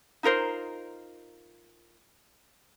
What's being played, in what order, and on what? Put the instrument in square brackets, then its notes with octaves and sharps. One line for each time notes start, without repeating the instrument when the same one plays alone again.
[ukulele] D#4 F4 A#4 C5